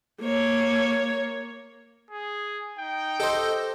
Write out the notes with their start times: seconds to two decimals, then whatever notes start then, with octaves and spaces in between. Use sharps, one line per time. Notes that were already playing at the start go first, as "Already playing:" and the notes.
0.22 A#3 C#5
2.11 G#4
2.78 D#4 G5
3.20 G4 A4 C5 D#5